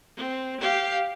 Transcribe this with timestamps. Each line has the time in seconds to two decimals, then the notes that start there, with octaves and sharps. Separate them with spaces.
0.17 C4
0.60 G4 F5